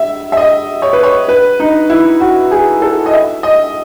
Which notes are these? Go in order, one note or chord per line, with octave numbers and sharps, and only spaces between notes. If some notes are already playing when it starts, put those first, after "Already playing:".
Already playing: E5
E5
D#5
C#5
B4
C#5
B4
D#4
E4
F#4
G#4
A4
D#5
E5
D#5